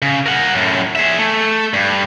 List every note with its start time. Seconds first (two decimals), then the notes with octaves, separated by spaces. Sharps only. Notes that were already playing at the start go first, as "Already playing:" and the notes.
0.02 C#3
0.26 A#4 F#5
0.55 F#2 A2
0.95 G#4 E5
1.19 A3
1.73 G2